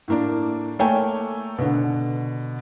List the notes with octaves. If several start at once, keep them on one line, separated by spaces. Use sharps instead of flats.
A2 A#3 D4
A3 A#3 C#5 G5 G#5
B2 D3